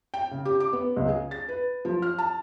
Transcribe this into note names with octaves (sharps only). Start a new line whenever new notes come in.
G5
C#3
G4
D6
B3
C#2
G#4
A6
B4
F3
F6
A5